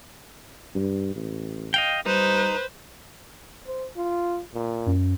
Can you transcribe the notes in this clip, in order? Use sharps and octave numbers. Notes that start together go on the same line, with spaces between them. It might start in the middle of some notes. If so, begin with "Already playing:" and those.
G2
A1
D#5 F5 G5
G3 D#4 B4 C5
C5
F4
A#2
F#2